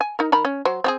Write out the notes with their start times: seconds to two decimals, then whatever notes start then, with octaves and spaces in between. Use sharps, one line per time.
0.01 G#5
0.19 D#4 A#4
0.32 D#3 A#4 B5
0.45 C#4
0.65 F#3 C5
0.84 C4 G4 G#4